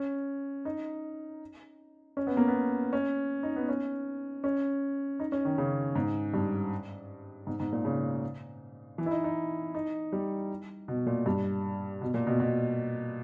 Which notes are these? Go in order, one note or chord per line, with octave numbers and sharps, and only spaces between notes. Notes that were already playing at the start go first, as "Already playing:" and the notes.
Already playing: C#4
D#4
C#4
B3
A#3
B3
C#4
D#4
B3
C#4
C#4
D#4
C#4
D#3
C#3
G#2
G2
G#2
G#2
A#2
C#3
E3
E4
D#4
D#4
D#4
G3
B2
A#2
G2
B2
A#2
B2
B2